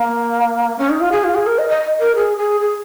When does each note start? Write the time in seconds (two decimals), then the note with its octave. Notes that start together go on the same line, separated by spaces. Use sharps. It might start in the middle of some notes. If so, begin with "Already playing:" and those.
Already playing: A#3
0.78 C#4
0.90 D#4
1.00 F4
1.12 G#4
1.24 F4
1.35 G#4
1.46 A#4
1.58 D#5
1.69 D#5
2.00 A#4
2.15 G#4
2.37 G#4
2.61 G#4